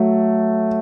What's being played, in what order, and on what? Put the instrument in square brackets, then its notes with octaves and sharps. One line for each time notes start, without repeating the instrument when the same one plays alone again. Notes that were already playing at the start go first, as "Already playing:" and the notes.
Already playing: [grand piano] F#3 A3